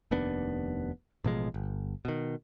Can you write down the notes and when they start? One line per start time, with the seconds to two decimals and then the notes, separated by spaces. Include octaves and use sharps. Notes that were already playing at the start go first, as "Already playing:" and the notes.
0.11 F1 D#2 B3 D4
1.24 A1 B2 F3 G#3
1.54 G1
2.05 B2 D#3